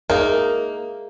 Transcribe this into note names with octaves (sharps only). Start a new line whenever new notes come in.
A#3 D#4 G#4 A#4 E5